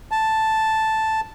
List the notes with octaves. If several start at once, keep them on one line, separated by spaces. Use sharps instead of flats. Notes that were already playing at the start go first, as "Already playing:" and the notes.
A5